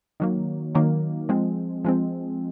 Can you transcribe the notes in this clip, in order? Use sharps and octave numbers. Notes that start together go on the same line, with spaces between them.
D#3 F#3 A#3
D#3 F#3 A#3
F3 G#3 C4
F3 G#3 C4